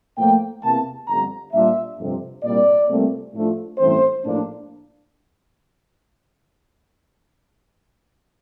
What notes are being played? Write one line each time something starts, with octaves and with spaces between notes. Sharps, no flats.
A2 F3 A#3 G5
E2 C3 E3 A#3 A5
G1 F2 D3 G3 A#5
A#2 G3 D4 F4 E5
G1 F2 C3
C2 A#2 G3 A#3 D5
C2 A#2 A3 C4
A2 F3 A3 D4 F4
A1 G2 E3 A3 C4 C5
A#1 A2 F3 A#3 D4